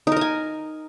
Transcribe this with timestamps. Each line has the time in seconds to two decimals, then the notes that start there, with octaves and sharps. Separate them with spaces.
0.07 D#4
0.12 A#4
0.17 D#5
0.21 G#5